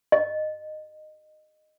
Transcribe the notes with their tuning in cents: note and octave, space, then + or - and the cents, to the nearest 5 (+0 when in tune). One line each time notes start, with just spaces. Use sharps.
D#5 -15